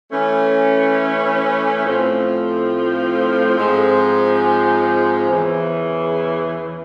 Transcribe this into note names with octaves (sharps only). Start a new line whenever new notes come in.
E3 A3 C#4
A2 F3 A3 C4 F4
G#2 F3 G#3 C4 F4
E2 C#3 E3